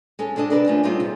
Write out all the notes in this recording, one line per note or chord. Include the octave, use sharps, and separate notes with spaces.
G#3 C#4 A4
C3 G#3 D4 G#4 A4 D#5
D4 G4 A#4 B4 D5
F3 A3 C#4 D5 D#5
G3 A3 C#4 D#4 F4 G#4
C3